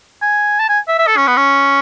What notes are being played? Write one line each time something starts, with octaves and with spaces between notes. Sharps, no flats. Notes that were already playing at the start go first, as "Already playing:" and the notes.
G#5
A5
G#5
E5
E5
A4
C#4
B3
C#4